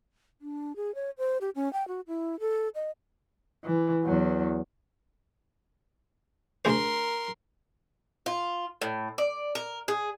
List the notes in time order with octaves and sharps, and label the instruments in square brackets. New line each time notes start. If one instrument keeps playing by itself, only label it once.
[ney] D4
G#4
C#5
C5
G4
C#4
G5
F#4
E4
A4
D#5
[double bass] E3
E2 F#3
[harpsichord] D2 G#4 C5 [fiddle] A#4 C6
[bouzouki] F4
A2
D5
A#4
G#4